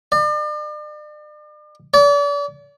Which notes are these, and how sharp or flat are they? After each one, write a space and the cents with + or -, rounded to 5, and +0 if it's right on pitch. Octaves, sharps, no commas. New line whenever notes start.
D5 +40
D5 -40